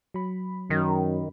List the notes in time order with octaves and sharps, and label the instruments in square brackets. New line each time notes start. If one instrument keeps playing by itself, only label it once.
[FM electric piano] F#3 B5
[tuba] F#2 [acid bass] D#3